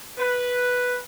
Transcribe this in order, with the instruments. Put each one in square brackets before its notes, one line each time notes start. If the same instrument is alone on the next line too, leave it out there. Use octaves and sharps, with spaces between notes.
[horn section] B4